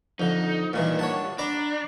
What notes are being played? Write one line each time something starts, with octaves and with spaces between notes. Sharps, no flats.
F2 D3 D#4
G2 A#2 D#3 E3
C#5 F#5 A5
D4 D5 A#5 B5